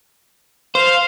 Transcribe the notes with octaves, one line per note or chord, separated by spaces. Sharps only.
C5 F5